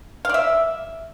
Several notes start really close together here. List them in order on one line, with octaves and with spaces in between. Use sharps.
F5 D5 E5